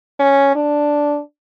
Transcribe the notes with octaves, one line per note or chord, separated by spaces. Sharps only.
C#4
D4